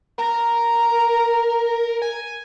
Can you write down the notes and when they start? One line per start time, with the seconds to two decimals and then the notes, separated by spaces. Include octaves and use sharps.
0.18 A#4 A#5
2.02 G#5